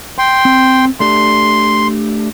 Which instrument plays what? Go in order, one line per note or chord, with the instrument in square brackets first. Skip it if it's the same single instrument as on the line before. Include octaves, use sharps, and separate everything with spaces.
[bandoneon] G5 C6
[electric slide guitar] C4
[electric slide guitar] A3 D4 G4 [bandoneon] C6